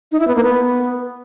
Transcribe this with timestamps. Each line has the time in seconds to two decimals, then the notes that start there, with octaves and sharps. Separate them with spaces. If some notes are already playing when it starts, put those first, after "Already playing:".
0.12 D#4
0.20 E4
0.28 B3
0.35 A#3
0.43 B3